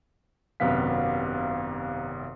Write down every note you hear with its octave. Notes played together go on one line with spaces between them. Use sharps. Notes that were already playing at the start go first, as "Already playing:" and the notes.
G#1 F#2 C3 B3 F5 B6